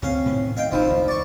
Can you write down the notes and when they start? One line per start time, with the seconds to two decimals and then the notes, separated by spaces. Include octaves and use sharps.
0.02 D2 C#3 C4 C#4 F5
0.26 A2 C3 D#3
0.57 D#3 D#5 F5 G5
0.72 E1 A1 F3 D#4 E4
0.90 C#2 D5
1.08 E3 D5 C#6